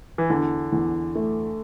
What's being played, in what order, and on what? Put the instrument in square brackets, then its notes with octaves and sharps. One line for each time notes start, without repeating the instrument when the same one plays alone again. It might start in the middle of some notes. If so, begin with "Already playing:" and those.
[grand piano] E3
[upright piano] E2 [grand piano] D3
[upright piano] E2
A3